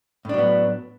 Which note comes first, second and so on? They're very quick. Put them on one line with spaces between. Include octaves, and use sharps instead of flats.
A2 D4 F#3 B3